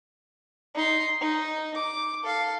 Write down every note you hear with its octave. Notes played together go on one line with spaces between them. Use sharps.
D#4 C6
D#4
D6
A4 F5